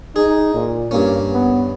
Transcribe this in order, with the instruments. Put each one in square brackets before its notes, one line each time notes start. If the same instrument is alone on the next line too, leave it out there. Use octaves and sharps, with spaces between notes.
[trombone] D#4 [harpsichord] G#4
[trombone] A#2
[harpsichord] G2 C#4 [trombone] A#3
[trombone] B3